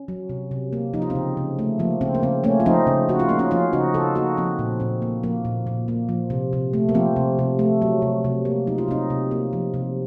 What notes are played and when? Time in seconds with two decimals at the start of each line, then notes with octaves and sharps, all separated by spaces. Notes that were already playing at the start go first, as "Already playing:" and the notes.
Already playing: C#4
0.08 F#3
0.29 C3
0.51 C3
0.73 A#3
0.93 F3 D#4
1.02 F4
1.10 C4 D#4
1.15 C#3
1.37 C#3
1.59 A3
1.79 F3 A#3
2.01 C#3 C4
2.15 A#3
2.22 C#3 C4
2.44 A3 A#3 C#4
2.60 F4
2.66 F3 C4 D#4
2.87 C#3
3.09 C#3 F#4
3.20 F4
3.29 A#3 D#4
3.39 C#4 F4
3.51 F3 C#4 F4
3.73 C#3 D#4 F#4
3.94 C#3 F4 A4
4.15 A#3 D#4 F#4
4.37 F3 C4
4.59 A#2
4.80 A#2 C4
5.02 A#3
5.24 F3 A#3
5.45 A#2
5.67 A#2
5.88 A#3
6.09 F3
6.30 C3
6.53 C3
6.73 A3
6.89 A#3
6.95 F3 C4
7.16 C3
7.39 C3
7.59 A3
7.82 F#3
8.02 C3
8.24 C3
8.45 A#3
8.67 F#3 D#4
8.78 F4
8.88 C3 C4 D#4
9.10 C3
9.31 A#3
9.53 F3
9.74 C3